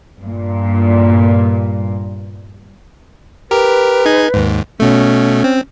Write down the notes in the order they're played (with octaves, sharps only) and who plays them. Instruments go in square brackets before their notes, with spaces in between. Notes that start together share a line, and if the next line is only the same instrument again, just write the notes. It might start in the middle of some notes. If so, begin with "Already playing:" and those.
[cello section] G2 A#2
[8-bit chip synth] G4 A#4 [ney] B4
[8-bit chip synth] D#4 G#4 G#6
D#2 G#2
[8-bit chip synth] B2 A3 [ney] C#4
[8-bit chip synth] C4